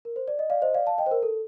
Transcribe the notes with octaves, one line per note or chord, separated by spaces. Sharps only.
A#4
C5
D5
D#5
D5 F5
C5 D#5
D5 F5
F5 A5
D#5 G5
C5
A#4
A4